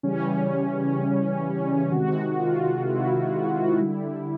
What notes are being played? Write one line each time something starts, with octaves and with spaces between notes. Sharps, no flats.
C#3 E3 G3 C#4
C3 D#3 G#3 F#4
F4
E4
D3 G3